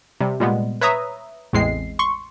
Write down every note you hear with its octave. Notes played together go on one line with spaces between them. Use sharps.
C3 G3
A#2 G3 G#3 B3
B4 C#5 E5 A#5 D#6
A1 E2 A2 G#3 C4 C7
C6 C#6